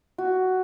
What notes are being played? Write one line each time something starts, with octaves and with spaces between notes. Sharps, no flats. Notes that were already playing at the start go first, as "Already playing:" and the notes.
F#4